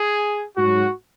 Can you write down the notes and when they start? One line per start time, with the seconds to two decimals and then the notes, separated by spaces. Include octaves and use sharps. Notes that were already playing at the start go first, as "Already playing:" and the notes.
Already playing: G#4
0.57 G#2 F#3 F#4